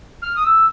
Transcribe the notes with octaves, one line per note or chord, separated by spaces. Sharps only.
F6
D#6
E6